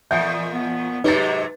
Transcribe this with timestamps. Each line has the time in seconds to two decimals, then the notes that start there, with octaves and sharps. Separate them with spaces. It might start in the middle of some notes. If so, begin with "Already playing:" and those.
0.11 E2 A#2 F3 E5 F#5 G#5 G6
0.53 B3
1.04 G#2 C3 F#3 D#4 G4 B4 A6